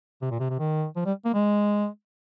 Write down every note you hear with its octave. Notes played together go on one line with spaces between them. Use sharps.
C3
A#2
C3
C3
D#3
F3
G3
A#3
G#3